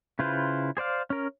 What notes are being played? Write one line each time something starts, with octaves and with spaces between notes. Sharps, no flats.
C#3 E4 F4 B4 C5
G#4 C5 D5 F5
C#4 A#4